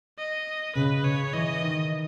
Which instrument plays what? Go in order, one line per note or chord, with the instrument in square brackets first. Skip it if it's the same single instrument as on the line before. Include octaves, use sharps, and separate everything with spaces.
[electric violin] D#5
[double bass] C#3 [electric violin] B4
[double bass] C#3 [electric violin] C#5
[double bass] E3 [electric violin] D#5
[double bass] D#3